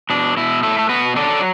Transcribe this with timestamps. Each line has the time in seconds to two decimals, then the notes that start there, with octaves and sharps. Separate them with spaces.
0.10 B2 D4
0.37 B2 E4
0.63 A3 E4 A4
0.79 A4
0.89 B2 F#4 B4
1.16 F#3 A4 D5